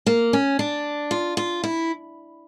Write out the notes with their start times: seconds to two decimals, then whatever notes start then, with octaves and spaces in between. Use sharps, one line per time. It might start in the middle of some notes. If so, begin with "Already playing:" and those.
0.06 A#3
0.33 C#4
0.59 D4
1.11 F4
1.37 F4
1.64 E4